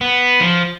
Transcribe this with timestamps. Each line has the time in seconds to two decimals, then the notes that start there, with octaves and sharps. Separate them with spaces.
0.01 B3
0.40 F3